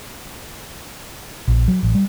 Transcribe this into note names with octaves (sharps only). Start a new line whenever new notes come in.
A#1
F#3
A1
G3